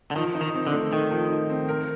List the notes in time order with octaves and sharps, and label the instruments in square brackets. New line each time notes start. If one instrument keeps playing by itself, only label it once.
[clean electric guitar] D3
[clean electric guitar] D#3 [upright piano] F3
[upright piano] D#4
[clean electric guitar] D#3
[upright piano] C4
[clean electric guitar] D3
[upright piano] A3
[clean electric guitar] D#3 [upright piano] A3
[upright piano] F3
D#4
C4
A#4